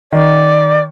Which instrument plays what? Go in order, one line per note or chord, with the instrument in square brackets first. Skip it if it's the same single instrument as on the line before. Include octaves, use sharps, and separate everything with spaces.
[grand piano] D#3 [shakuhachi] D5